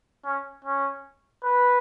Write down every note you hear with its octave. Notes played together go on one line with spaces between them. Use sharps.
C#4
C#4
B4